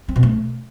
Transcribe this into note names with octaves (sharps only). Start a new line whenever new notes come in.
C4
B2
A3